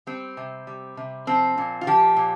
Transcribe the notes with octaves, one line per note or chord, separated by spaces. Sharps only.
G3 C4
C3
G3
C3
F3 C4
A#2
F4
F3 G4
A#2